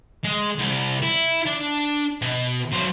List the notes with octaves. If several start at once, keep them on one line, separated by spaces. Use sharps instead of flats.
G#3
C2
E4
D4 A5
B2
F#3 C5